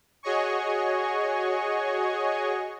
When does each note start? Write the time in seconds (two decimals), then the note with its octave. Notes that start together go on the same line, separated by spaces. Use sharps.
0.23 F#4 G#4 C#5 D#5 G#5 C#6